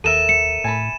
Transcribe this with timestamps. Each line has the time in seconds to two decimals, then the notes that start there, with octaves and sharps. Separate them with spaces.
0.04 D#2 A4 A#4 E5 D#7 E7
0.29 C#7
0.64 A2 G#5 A5 B5